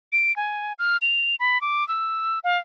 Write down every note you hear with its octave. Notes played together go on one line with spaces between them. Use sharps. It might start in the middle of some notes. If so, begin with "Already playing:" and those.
D7
G#5
F6
F7
B5
D6
E6
F5